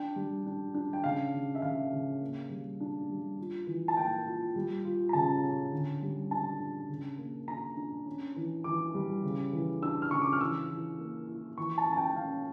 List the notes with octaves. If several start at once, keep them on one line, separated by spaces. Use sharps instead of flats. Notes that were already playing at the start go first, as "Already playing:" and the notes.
Already playing: D4 G5
G3
D4
D4
G5
C#3 F5
C#3
E5
C#3 F5
C#3
A#3
G3
D4
G3
F4
E3
A5
A#3 G5
F4
G3
F4
A#5
C#3 A5
C#4
D3
G3
D4 A5
D4
C#3
A#3
D4 A#5
D4
C#4
E3
E3 D6
G3
C#3
E3
D4 E6
F6
C#3 C#6
D6
F6
E3 E6
E3
A#3
E4
E3 C#6
A5
C#4
A5
G5
G5
C#4 F5